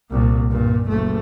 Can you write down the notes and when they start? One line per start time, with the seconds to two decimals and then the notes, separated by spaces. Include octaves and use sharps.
0.11 C2 A#2
0.51 G2 A#2
0.88 F#1 A3